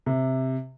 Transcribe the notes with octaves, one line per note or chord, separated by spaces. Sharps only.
C3